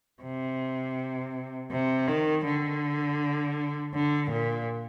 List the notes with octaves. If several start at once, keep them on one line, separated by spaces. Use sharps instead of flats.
C3
C3
D#3
D3
D3
A#2